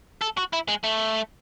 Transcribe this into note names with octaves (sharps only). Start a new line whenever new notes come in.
A4
F#4
E4
G#3
A3